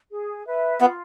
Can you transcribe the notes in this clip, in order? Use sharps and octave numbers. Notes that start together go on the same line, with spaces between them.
G#4
B4 E5
B3 F4